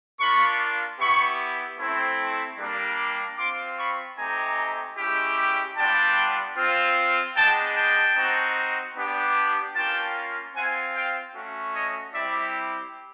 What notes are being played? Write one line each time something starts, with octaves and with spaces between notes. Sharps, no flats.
A#3 D4 F4 B5 C#6
B3 E4 G4 B5 C#6
A3 C4 E4
G3 A#3 D4
C4 F4 C6 D6
B5 C#6
A3 C4 D#4 G4 G#5 A#5
G#3 C#4 E4 G4
G3 B3 D4 F4 G5 A5
C4 F4
G#3 B3 D4 G5 A5
G5 A5
C4 D#4 F#4
B3 D4 G4
A#3 C#4 F4 G5 A5
C4 F4 F#5 G#5
F5 G5
A3 C#4 F#4
C#5 D#5
G3 C4 E4 G4 D5 E5